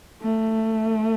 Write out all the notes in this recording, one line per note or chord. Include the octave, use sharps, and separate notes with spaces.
A3